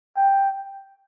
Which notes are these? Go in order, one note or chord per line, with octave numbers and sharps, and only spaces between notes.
G5